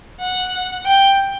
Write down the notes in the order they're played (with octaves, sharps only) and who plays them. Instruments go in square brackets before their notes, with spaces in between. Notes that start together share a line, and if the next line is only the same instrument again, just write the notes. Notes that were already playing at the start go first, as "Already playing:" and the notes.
[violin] F#5
G5